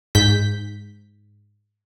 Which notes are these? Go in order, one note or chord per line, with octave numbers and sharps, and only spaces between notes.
G#2 G6 B6